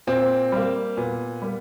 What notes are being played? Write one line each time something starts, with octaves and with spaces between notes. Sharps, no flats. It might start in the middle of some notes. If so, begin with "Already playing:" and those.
A#2 C4
G3 A#3
A#2 B3
G3 A#3